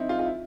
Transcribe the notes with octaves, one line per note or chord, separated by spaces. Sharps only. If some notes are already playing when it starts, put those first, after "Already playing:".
Already playing: C4 D#4 E4
F4
F4
E4